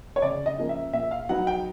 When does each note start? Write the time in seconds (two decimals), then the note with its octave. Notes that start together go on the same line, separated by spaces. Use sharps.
0.16 C#5
0.22 C#3 D5
0.46 D#5
0.58 F3 A#3 C#4
0.69 E5
0.93 A#2 E5
1.11 F5
1.29 F#3 B3 D#4 F#5
1.47 G5